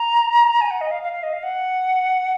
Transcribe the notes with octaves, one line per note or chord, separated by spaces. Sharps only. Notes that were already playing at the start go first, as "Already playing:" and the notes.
Already playing: A#5
G#5
F#5
D#5
F5
F5
F5
D#5
F5
F#5